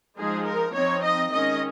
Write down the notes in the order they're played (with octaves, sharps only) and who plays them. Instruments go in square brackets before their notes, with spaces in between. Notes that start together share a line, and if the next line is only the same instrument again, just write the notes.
[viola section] F3 G#3 D#4 G#4
A#4
F3 C4 D#4 C#5
D#5
D#3 G#3 C#4 D#5